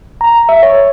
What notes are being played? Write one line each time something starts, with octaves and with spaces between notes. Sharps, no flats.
A#5
E5
C#5